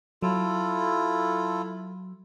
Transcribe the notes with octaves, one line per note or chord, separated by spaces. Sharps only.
F#3 E4 F4 A4